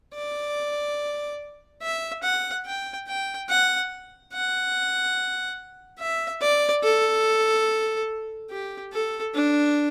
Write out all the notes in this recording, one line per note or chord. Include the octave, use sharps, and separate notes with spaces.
D5
E5
F#5
G5
G5
F#5
F#5
E5
D5
A4
G4
A4
D4